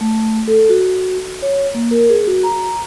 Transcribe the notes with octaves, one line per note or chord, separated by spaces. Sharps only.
A3
A4
F#4
C#5
A#3
A#4
G#4
F#4
A#5